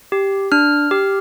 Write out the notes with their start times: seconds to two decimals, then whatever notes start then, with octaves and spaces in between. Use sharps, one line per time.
0.12 G4
0.52 D4 F6
0.91 G4